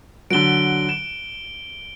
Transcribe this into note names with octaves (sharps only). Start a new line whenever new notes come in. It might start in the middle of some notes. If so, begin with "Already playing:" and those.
D3 F#3 D7 G7
E7